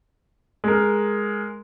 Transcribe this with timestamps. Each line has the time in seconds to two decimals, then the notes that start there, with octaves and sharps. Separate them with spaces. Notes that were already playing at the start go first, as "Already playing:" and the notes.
0.64 G#3 A#4